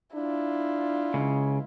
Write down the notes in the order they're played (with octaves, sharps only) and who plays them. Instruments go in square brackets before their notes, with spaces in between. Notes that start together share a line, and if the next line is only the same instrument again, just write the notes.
[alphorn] D4 [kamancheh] E4 F4
[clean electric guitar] C#2 [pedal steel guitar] C#3